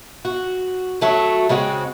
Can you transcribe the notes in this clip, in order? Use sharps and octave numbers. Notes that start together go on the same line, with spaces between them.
F#4
F#3 A3 F#4
C#3 G#3 C4 F#4